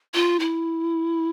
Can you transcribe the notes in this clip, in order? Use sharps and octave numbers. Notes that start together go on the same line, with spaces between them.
F4
E4